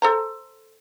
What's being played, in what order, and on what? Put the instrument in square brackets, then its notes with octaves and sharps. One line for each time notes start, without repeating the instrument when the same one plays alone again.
[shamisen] A4 C5 A#5